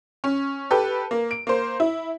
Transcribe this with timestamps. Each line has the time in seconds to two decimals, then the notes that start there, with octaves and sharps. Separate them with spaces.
0.24 C#4
0.71 G4 A4 B4
1.11 A#3
1.31 D7
1.47 A#3 C5
1.80 E4